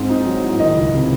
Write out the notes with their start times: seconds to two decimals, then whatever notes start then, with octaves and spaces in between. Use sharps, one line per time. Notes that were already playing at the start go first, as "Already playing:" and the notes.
Already playing: G#2 C4
0.09 D#4
0.26 F#3
0.43 A2
0.60 D#3 D#5
0.76 C#2
0.93 C3